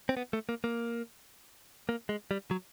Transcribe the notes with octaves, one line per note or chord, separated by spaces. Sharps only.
C4
B3
A3
A#3
A#3
A#3
G#3
G3
F#3